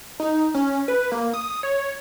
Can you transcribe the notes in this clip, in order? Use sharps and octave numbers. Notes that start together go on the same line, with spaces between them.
D#4
C#4
B4
A#3
D#6
C#5